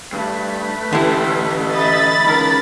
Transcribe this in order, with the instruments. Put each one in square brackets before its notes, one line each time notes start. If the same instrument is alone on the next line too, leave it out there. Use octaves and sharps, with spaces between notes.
[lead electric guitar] G2 [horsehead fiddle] A3 B4
[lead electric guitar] A2 G4 [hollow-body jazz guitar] D3 E3
[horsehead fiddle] D#5 E5 [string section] B5 A6
[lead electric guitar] C#2 [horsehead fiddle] D#4 A#4